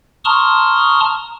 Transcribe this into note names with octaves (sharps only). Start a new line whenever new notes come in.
A5 A#5 C6 C#6 D#6 F6